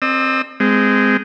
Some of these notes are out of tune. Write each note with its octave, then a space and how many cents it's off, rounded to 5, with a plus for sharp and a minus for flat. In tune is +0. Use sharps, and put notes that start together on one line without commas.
C4 +15 D#5 -45 E6 -20
G#3 -5 C4 -25